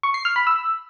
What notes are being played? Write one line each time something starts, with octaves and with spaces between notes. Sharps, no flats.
C#6
C7
F6
B5
E6